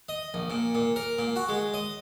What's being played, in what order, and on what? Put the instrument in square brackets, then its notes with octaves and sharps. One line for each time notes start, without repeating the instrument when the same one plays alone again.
[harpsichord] D#5
A#1
A#2
A#2
A#4
A#2
F#4
G#3
D#5